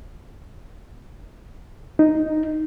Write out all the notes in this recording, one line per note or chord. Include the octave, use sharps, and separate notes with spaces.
D#4